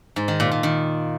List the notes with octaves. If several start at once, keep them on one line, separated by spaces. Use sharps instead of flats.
G#2
D#3
A#2
A#2
D#3